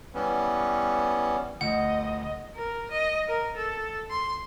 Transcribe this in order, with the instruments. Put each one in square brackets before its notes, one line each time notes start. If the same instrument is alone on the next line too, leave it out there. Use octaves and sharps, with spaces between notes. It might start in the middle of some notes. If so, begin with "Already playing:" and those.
[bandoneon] E3 G3 B3 C#4
[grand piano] G1 D2 [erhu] D#5 [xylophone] F#5
[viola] A#4
D#5
A#4
A4
C6